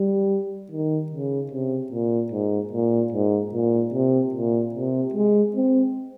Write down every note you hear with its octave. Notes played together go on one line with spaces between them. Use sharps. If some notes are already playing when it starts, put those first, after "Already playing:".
Already playing: G3
D#3
C#3
C3
A#2
G#2
A#2
G#2
A#2
C3
A#2
C3
G#3
C4